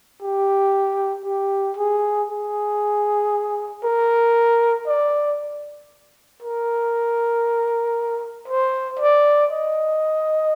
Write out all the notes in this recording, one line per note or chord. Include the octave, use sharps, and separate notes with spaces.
G4
G4
G#4
G#4
A#4
D5
A#4
C5
D5
D#5